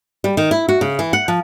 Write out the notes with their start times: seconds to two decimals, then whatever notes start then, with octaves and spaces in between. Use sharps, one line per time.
0.24 G3
0.37 D#3
0.51 E4
0.69 F#4
0.81 C#3
0.99 E3
1.13 F#5
1.28 F3